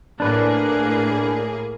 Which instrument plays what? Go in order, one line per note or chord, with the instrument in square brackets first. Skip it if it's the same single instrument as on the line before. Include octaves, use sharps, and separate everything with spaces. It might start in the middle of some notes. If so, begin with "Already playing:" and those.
[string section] A2 A#3 G#4 [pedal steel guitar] D4 B4 D5